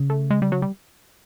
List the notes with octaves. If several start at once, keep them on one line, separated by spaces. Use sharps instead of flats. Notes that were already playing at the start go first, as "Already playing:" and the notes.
Already playing: C#3
A3
G#3
G3
F#3
G3